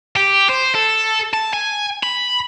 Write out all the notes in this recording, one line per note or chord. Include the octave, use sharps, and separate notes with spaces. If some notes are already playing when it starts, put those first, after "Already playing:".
G4
C5
A4
A5
G#5
B5